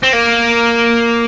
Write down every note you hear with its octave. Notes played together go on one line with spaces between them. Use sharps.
C4
A#3